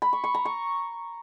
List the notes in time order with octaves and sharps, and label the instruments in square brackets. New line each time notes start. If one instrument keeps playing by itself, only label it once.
[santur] B5
C#6
C#6
A#5
C#6